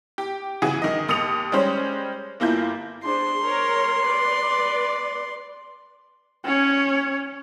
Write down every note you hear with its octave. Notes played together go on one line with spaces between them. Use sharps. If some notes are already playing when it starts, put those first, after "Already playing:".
G4
C#3 E3 E4 F#4 G#4
D#3 D#5
D#2 D#6 C#7 F7
G3 G#3 C#4 C5 C#5
G1 A#3 E4 F4 G6
D4 G#4 C5 C6
A#4 C#5
B4 D5
C#4 C#5